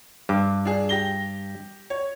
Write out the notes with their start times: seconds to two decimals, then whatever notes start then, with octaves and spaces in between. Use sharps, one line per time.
0.29 G2 D6
0.65 D4 G#4
0.89 G4 A#6 G7
1.90 C#5